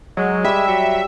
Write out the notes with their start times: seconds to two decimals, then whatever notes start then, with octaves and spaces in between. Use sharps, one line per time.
0.17 F#3 G#3
0.45 G3 E5 D6
0.67 F#3